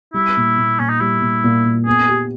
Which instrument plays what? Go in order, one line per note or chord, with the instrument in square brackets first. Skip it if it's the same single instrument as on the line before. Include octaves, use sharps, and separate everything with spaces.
[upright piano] G3 [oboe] E4
[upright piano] A#2
A#2
[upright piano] A#2 [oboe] C#4
[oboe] D#4
[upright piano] G3 [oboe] E4
[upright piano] A#2
A#2
A#2
[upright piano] B3 [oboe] G#4
[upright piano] G4